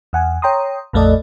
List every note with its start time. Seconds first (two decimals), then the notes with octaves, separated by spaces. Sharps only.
0.13 E2 F#5 G#5
0.42 C#5 G5 A#5 C6 D#6
0.93 A#1 F2 A3 A4 D5 D#5